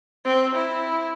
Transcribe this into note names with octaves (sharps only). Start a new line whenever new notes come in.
C4
E4